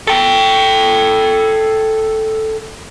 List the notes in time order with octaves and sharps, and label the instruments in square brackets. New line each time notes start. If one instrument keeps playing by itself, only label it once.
[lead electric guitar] A4 G5